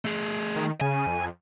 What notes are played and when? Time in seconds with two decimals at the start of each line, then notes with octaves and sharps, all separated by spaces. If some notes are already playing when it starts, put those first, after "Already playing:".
0.05 A3 G#4
0.56 D#3
0.81 C#3 G#5
1.07 F2